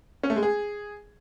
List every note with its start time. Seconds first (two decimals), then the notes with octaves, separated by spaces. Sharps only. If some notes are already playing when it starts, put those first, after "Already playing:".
0.23 C#4
0.30 A3
0.36 G#3
0.43 G#4